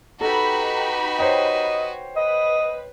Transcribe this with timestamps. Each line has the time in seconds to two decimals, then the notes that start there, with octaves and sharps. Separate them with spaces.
0.21 D#4 F#4 G4 A4 B4 A#5 B5
1.19 C5 C#5 D#5 G5
2.16 B4 D#5